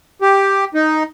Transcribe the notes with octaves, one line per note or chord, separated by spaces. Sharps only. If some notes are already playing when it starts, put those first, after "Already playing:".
G4
D#4